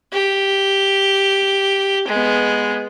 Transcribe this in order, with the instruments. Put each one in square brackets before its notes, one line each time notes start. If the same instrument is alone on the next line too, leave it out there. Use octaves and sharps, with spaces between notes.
[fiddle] G4
G#3 B3